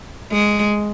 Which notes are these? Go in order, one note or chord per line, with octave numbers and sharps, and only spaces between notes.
G#3